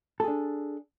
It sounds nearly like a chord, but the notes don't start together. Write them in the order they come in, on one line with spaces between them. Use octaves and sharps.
A4 G#4 D4